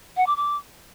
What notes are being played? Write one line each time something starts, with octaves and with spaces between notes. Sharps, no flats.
F#5
D6
D6